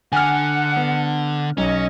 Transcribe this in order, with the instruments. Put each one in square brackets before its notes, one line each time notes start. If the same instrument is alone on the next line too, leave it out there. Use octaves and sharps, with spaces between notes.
[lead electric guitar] D3 [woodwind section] F#5 [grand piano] G#5 F6
[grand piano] B3
[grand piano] B1 [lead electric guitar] C#4 [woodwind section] C#5 D#5